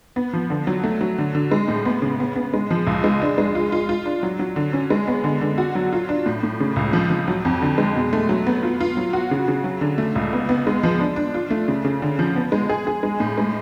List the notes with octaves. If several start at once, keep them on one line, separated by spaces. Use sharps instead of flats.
B3
F3
D3
F#3
A3
F#3
D3
D3
G#3
A2
B3
C#3
B3
B3
G#3
F3
C#2
G#3
D4
G#3
F4
F4
F4
D4
F#3
F#3
D3
C#4
G#3
B3
D3
D3
F#4
F#3
F4
D4
A2
A2
C#3
C#2
F3
F3
F#3
F2
D3
G#3
B2
A3
F#3
B3
F4
F4
F#3
F#4
C#3
C#3
F#3
D3
A3
C#2
B3
B3
G#3
F3
D4
D4
F4
A3
C#3
C#3
D3
F3
B3
G#3
G#4
G#4
G#3
A2
G#3